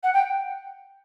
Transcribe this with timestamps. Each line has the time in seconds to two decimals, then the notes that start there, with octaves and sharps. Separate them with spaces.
0.03 F#5
0.13 G5